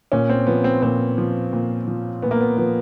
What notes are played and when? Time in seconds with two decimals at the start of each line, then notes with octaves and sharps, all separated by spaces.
0.12 A#2 C#4
0.29 C4
0.47 F3 B3
0.64 C4
0.82 A#2 C4
1.18 F3
1.53 A#2
1.88 F3
2.22 A#2 B3
2.31 A#3
2.41 B3
2.57 F3 B3